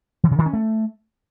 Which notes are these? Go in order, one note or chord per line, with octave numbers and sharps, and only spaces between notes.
E3
C#3
D#3
C#4
A3